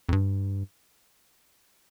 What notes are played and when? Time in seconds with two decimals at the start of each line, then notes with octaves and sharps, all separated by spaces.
0.09 F2
0.12 G2